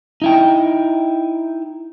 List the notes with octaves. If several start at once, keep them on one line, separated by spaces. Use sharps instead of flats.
D#4 E4 G5